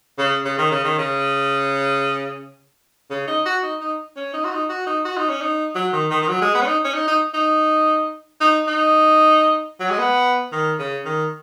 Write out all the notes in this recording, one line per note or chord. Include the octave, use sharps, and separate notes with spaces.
C#3
C#3
D#3
C#3
D#3
C#3
C#3
D#4
F#4
D#4
D#4
C#4
D#4
F#4
D#4
F#4
D#4
F#4
D#4
C#4
D#4
F#3
D#3
D#3
D#3
F#3
G#3
B3
C#4
D#4
C#4
D#4
D#4
D#4
D#4
D#4
F#3
G#3
B3
D#3
C#3
D#3